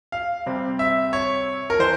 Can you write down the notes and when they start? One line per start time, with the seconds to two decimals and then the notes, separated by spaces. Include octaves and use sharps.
0.12 F5
0.46 C3 G3 C4
0.79 E5
1.13 C#5
1.70 A#4
1.79 E3 C5